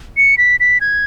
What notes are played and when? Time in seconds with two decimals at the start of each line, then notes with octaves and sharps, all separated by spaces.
0.17 C#7
0.38 B6
0.60 B6
0.81 G#6